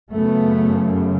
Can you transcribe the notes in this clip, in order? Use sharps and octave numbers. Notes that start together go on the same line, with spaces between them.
F#2 C#3 A3 B3